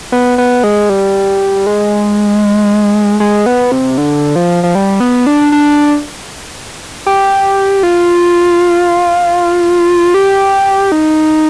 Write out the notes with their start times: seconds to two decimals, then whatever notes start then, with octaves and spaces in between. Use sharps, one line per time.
0.12 B3
0.38 B3
0.64 G#3
0.90 G3
1.67 G#3
3.20 G#3
3.46 B3
3.72 C3
3.98 D3
4.36 F3
4.63 F3
4.75 G3
5.00 B3
5.27 D4
5.52 D4
7.06 G4
7.83 F4
10.14 G4
10.92 D#4